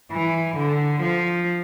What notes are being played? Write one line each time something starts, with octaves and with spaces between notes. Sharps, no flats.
E3
D3
F3